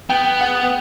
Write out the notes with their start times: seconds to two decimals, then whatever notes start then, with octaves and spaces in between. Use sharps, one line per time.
0.10 B3 G5
0.41 F#5